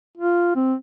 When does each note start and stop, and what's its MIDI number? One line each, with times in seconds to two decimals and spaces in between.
0.17 0.55 65
0.56 0.74 60